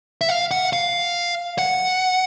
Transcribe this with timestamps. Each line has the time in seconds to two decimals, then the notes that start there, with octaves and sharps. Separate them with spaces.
0.21 E5
0.29 F5
0.51 F#5
0.73 F5
1.58 F#5